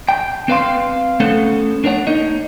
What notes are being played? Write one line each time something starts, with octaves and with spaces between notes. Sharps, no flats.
G5
C4 B4 F5 C6
A3 B3 C#4 A4 C5 F#5
D4 A#4 C#5 F#5
A#3 D#4 D#5